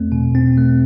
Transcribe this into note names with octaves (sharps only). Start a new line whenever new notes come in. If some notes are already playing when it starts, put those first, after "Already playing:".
Already playing: E2 A3 C4
B2
C4
A3